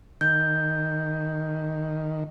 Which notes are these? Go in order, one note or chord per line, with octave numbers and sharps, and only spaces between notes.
D#3 G6